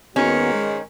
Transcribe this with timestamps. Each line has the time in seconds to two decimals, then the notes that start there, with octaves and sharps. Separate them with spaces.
0.16 D#2 G#2 D#3 B3 C#4 F#4
0.53 G#3